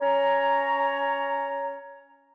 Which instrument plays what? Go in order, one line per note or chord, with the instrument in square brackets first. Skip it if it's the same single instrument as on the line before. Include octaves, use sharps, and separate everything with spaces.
[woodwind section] C#4 C#5 A#5